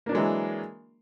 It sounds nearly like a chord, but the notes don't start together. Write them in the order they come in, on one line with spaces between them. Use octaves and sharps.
A#3 D4 F#3 G#3 E3